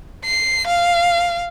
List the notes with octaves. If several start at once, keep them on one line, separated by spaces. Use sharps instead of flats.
C7
F5